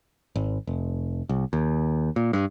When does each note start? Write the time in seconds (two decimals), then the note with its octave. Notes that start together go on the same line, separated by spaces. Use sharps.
0.36 G#1
0.67 F1
1.29 C2
1.53 D#2
2.16 A#2
2.33 G2